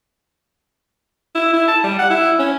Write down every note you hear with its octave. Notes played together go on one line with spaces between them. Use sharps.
E4
E4
A5
G3
F#5
E4
C#4